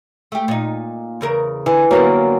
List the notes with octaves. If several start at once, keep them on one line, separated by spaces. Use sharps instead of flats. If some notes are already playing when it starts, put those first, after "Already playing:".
A3 G4
A#2 D#4
E2 C#3 A#4
D3 E3 G#5
D3 F#3 G3 A#3 B3